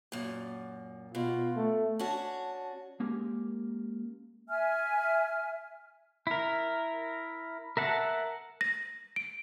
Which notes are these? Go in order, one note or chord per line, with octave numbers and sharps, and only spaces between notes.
F#2 A#2
B2 F4
A3
C#4 D4 F#4 A5
G#3 A#3 C#4 G4 A#4
E5 G#5 F6
E4 A#4
A#4 E5 F#5 A5
A#6
D7